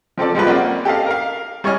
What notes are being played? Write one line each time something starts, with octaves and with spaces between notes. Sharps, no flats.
F3 C4 A4 D5
F3 G3 G#3 C4 F4 B4
A#3 C4 C#4 D5 F#5
G4 A4 D#5 F5
A#4 F5
G3 C#5 D#5 G#5 F6